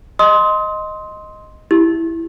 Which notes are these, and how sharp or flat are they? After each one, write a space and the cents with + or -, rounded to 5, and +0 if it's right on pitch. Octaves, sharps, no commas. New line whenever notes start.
D#5 +0 C6 +0 D#6 +30
E4 +0 G4 +0